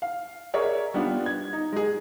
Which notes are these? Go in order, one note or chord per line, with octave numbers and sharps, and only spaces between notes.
F5
G#4 A#4 C#5 D5 E5
G3 B3 D4 F4
G#6
D#4
G#3 G#4